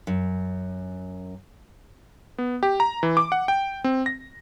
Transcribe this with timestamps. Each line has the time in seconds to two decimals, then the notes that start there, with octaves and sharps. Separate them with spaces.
0.07 F#2
2.38 B3
2.63 G4
2.80 A#5
3.03 E3
3.17 D6
3.32 F#5
3.48 G5
3.84 C4
4.06 A#6